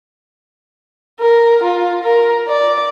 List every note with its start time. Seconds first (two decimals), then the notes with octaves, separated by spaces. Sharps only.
1.20 A#4
1.63 F4
2.04 A#4
2.48 D5